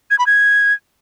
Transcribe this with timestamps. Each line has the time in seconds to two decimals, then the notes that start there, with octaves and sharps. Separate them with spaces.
0.11 G#6
0.18 B5
0.26 G#6